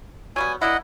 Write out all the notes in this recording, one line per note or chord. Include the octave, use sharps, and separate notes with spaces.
F#3 G3 B3 G#5
A#3 D4 E4 D#5 F#5